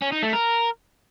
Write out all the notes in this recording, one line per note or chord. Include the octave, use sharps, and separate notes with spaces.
C#4
D#4
A3
A#4